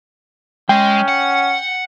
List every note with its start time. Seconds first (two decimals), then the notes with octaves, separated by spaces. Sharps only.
0.69 G#3 C#4 G5
1.08 F#5